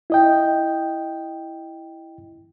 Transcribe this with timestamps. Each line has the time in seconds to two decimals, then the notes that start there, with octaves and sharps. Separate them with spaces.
0.10 E4 D#5 G5